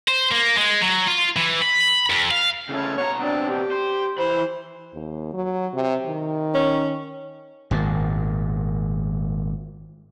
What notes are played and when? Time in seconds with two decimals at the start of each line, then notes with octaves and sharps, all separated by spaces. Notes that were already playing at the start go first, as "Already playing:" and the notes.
0.08 C5
0.32 A#3
0.58 G#3
0.82 F#3
1.08 F4
1.36 E3
1.62 B5
2.10 F2
2.31 F5
2.69 C#3 A3 C#4
2.98 B2 C#5 A#5
3.19 B2 C4 D4
3.49 G4
3.71 C5
4.18 E3 C5 B5
4.94 D#2
5.33 F#3
5.74 C3
6.07 D#3
6.55 C#4
7.71 G#1 A#2